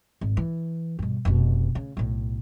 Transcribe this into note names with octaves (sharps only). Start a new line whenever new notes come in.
G#1
E3
G2 B2
F1 B2
C#3
B1 A2